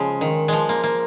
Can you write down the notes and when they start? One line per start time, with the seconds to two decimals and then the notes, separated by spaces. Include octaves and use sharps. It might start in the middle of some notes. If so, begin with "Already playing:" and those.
Already playing: C#3 F3 G#3
0.21 D#3
0.48 F3 G#3
0.69 A#3
0.84 A#3